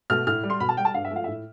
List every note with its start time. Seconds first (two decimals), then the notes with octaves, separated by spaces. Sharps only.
0.10 B2 A3 F6
0.27 A2 F6
0.43 G3
0.50 C6
0.60 B2 B5
0.69 A5
0.77 G3 G5
0.85 A5
0.94 G2 F5
1.05 E5
1.11 F3 A3 F5
1.24 E5
1.27 A2